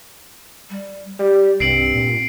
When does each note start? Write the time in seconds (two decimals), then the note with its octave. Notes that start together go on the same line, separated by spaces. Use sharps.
0.70 G3
1.19 G3 G4
1.60 C2 G2 C4 C7 D7 F#7
1.94 A#2